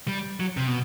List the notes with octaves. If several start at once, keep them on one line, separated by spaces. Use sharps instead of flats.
G3
F#3
C3
B2